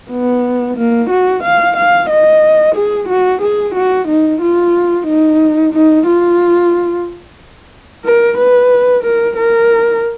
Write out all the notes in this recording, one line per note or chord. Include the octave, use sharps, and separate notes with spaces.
B3
A#3
F#4
F5
F5
D#5
G#4
F#4
G#4
F#4
D#4
F4
D#4
D#4
F4
A#4
B4
A#4
A#4